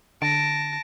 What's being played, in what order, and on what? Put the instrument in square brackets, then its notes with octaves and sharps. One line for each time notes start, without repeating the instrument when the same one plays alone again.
[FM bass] D3 [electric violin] A5 A#6 [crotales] D7